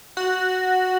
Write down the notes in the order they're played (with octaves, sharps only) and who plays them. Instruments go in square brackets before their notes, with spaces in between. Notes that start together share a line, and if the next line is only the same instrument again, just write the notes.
[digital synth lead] F#4